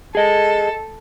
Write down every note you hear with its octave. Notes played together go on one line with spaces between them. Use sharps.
G#4 A4 D#5